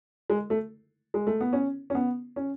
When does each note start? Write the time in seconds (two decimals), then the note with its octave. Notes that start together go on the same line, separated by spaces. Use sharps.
0.30 G#3
0.50 A3
1.14 G#3
1.27 A3
1.41 B3
1.53 C#4
1.90 C#4
1.95 B3
2.36 C#4